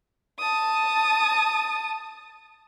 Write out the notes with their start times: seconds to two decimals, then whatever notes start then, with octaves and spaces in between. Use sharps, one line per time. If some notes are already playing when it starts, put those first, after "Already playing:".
0.39 A5 D#6